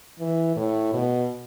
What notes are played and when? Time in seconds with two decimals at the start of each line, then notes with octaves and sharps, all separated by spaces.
0.20 E3
0.56 A2
0.93 B2